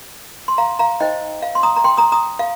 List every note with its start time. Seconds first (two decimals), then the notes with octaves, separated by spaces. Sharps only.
0.48 C6
0.58 F5 A#5
0.79 F5 A#5
1.00 D#4 C5 D#5 G5
1.42 F5
1.55 C6
1.63 A#5 D#6
1.76 A#5
1.84 G5 C6
1.98 A#5 D#6
2.12 A#5 D#6
2.39 F5